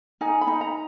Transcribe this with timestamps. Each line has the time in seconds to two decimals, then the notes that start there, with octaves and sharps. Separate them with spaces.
0.21 D#4 G#5
0.41 B5
0.47 D#4
0.61 A#5